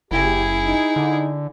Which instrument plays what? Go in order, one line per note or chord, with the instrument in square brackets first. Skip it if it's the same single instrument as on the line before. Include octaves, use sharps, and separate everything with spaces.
[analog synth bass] F#1 [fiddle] E4 G#4 [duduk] G4
[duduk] D#4
[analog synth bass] D3